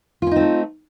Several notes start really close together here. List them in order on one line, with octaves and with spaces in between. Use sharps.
F4 C#4 D#4 C4 A3